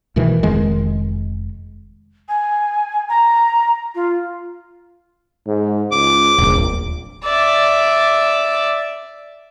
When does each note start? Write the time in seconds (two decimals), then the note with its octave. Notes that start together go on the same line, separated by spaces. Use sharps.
0.16 D2 B2 D#3 E3
0.43 F1 F2 D#3 G#3
2.29 G#5
3.09 A#5
3.95 F4
5.47 G#2
5.92 C#2 D6
6.38 D1 A#1 D#2
7.24 D5 E5